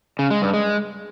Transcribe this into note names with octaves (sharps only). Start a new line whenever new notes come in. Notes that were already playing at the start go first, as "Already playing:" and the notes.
C#3
G#3
G2
G#3